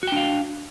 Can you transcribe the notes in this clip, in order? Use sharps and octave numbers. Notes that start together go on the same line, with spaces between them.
D4 F#4 F5 G5